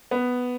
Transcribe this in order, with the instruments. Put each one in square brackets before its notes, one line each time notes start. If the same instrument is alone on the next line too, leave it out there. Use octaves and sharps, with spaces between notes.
[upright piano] B3